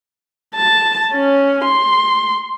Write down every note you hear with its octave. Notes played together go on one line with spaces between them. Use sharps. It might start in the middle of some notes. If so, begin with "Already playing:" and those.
A5
C#4
C6